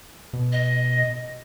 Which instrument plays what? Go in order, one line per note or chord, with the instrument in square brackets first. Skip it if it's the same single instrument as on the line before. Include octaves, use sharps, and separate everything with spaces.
[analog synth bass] B2
[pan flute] D#5